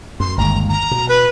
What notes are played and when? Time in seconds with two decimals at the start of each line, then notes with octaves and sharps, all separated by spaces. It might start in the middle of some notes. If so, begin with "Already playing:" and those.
0.20 F#2 C6
0.37 G1 D#2 G#3 A#5
0.69 A#5
0.91 B2
1.08 B4